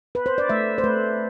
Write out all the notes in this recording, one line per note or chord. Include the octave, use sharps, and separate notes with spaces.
B4
C5
D5
A3 E5
C5
A3 B4